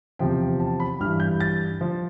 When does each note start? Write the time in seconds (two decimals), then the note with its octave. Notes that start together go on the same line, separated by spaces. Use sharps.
0.19 E2 C3 F3 G5
0.60 A5
0.80 B5
1.00 G2 E3 F6
1.20 G6
1.40 A6
1.81 F3